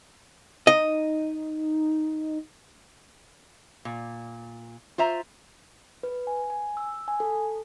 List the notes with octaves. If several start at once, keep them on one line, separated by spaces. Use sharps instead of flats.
D#4 D#5
A#2
F4 C5 E5 A#5
B4
G#5
G#5
E6
G#5
A4